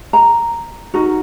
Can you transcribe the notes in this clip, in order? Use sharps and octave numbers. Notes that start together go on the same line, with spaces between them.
A#5
D#4 F#4 A#4